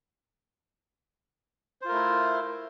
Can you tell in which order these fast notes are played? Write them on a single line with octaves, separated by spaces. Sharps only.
C5 F4 A#4 A3 E4